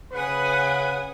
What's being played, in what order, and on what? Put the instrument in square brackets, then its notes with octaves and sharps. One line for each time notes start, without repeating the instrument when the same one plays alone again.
[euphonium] C#3 [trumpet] B4 [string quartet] F#5 G#5 D#6